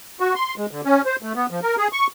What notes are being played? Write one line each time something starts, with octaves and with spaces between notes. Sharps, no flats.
F#4
C6
G#3
D3
C#4
C5
A3
B3
F3
A#4
G#4
C#6